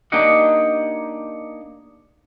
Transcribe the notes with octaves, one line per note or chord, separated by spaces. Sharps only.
A#3 D4 D#4 G4 D#5 F#5